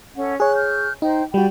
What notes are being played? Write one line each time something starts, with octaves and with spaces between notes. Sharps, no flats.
C#4 A4 F#5
G#4 C#5 F#6
F6 G6
D#4 C5 G5 A#5
G3 F#4 D5 G5 B5